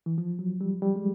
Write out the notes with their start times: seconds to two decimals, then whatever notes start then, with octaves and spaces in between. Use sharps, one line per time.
0.06 E3
0.18 F3
0.39 F#3
0.61 G3
0.82 G3
0.96 G#3